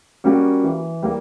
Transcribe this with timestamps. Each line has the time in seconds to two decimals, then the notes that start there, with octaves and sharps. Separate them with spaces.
0.24 G3 A#3 C#4 F#4
0.64 E3
1.03 G3 A#3